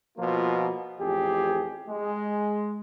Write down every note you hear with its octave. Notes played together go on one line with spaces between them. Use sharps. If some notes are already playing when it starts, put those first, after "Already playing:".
B2 F3 A#3 F4
A1 F2 G4 G#4
G#3